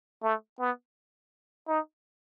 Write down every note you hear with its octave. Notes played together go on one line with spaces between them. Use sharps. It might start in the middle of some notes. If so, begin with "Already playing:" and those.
A3
B3
D#4